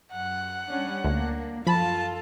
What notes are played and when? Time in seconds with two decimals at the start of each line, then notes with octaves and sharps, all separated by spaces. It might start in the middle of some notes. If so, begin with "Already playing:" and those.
0.13 F#2 F#5
0.69 G3 C#4 D4
1.04 D2 A#3 D4
1.67 F#2 F3 F4 A4 A5 B5